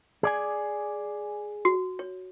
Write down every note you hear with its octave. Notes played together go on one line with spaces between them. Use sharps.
G#4 D5 G#5
F#4
C#5